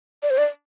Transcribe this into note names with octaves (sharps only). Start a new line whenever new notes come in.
D5
C5
D5